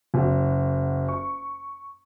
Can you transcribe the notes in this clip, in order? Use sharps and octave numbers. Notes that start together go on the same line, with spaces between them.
F#1 F#4
C#6